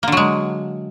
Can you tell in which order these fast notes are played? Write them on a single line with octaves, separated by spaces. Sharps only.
A#3 D3 F#3 G#3